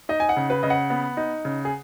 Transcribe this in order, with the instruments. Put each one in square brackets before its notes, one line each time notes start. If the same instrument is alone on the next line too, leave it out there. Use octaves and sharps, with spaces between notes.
[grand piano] D#4 D#5
G#5
F#5
C#3
B4
C#3 D#5
F#5
B3
D#4
C#3
G#4